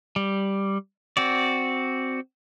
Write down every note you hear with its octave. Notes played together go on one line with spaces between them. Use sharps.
G3
C4 F#4 D5